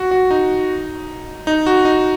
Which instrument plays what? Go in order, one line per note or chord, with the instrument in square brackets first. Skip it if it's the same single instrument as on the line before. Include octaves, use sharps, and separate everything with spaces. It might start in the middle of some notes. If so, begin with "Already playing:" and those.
Already playing: [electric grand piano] F#4
F#4
D#4
D#4
F#4
D#4